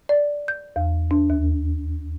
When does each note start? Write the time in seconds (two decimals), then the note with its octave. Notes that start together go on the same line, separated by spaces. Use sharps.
0.09 D5
0.48 G6
0.76 E2
1.11 D4
1.30 D#2